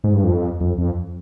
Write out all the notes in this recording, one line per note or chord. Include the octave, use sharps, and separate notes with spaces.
G#2
G2
F2
F2
F2